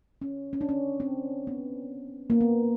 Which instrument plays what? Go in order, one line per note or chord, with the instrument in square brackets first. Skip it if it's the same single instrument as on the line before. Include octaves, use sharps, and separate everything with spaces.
[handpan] C#4
C#4
D4
C#4
C4
B3
A#3
B3